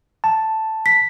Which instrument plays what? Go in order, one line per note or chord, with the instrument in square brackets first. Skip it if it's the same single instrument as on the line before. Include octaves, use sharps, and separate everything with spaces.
[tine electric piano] A5
[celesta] B6